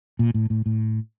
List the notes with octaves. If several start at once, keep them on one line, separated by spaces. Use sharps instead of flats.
A#2
A2
A2
A2